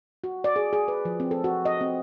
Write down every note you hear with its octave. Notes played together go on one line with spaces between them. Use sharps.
F#4
D5
G#4
G#4
B4
F3
C4
A4
F#4
D#5
C4